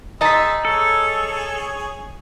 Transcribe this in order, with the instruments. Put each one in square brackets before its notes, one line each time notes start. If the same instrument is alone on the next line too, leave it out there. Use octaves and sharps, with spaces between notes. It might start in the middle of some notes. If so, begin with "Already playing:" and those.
[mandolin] D#4 A5 [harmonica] G#4 C6 E6 [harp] D#5 B6
[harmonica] G#4 C#5 [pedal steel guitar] A4